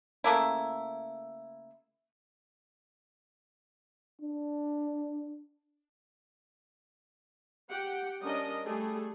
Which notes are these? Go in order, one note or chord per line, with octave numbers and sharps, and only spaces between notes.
C#3 A3 A#3 E4
D4
G4 F#5 G5
G3 C#4 D4 A#4 D#5
G3 A3 G#4